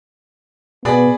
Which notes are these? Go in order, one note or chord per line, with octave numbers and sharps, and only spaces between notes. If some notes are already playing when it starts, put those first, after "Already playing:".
B2 B3 G#4 D5 B5